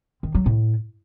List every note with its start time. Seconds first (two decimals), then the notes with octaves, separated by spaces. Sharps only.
0.23 D#3
0.35 F#3
0.46 A2